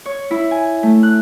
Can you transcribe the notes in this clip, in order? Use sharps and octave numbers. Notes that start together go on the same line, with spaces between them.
C#5
E4
G#5
A3
F#6